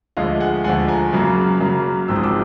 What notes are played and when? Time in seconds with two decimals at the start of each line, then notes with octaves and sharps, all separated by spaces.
0.17 D2 D3 F3 G#3 D#5 F5
0.40 F#5 G#5
0.64 D2 D3 F3 G#3 F#5 G#5
0.88 G#5 A#5
1.13 F#2 C#3 F#3 A#3
1.60 F#2 C#3 F#3 A#3
2.08 G#1 G#2 F3 G#3 C4 E6
2.16 D#6
2.23 D6 E6